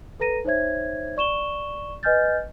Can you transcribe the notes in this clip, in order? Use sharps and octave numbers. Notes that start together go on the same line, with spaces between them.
A4 B4 A#5 A#6 D#7
D#4 C5 C#5 E5 G#6
D5 C#6 E7 G7
B4 D#5 G#5 F6 G6 A6